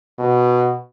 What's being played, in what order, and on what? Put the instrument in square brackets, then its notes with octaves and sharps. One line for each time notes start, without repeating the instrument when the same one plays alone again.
[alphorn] B2